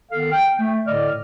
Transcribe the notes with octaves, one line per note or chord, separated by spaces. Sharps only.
D#3 B3 A4 F5
G5
A3
A2 D3 D5 D#5 F6